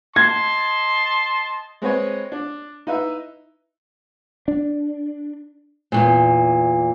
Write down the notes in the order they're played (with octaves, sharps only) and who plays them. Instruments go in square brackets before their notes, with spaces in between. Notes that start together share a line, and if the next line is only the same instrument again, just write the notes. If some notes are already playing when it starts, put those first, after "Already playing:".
[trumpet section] D#5 A5 C6 [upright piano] G#6
[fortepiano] G#3 C4 B4 C#5 D#5
D4
D#4 E4 B4 E5
[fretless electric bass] D4
[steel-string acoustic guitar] E2 G2 A#2